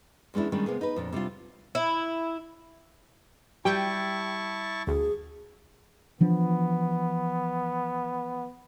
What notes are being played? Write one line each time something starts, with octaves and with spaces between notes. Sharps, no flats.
E2 G#3 C#4 D4 E4
D#3 G3 G#3 A#3 C#4 D4
C3 A#3 B3 G#4
D#4 B4
F2 A#2 D4
C3 G3 D4 F4
E4
G3 E4 G5 A5 C#6
D2 G#4
E3 F3 B3 D4